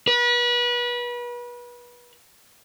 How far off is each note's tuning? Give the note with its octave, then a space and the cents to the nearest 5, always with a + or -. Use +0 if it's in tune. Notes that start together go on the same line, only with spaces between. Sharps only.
B4 -30